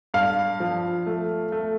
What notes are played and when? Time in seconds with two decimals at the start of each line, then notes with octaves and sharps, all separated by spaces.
0.14 G2 F5
0.60 F3
1.06 A3
1.52 A3